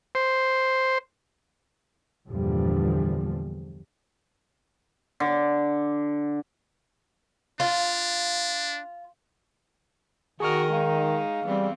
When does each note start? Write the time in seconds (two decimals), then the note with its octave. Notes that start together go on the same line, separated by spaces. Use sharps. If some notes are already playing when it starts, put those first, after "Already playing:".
0.15 C5
2.27 E2 G2 A#2 D3 F3 G3
5.20 D3
7.60 D4 F4
10.40 D#3 F#4 G#4 A#4 D#5 C#6 F6
10.72 G#3 D#4 F5
11.45 E3 G3 B3 C4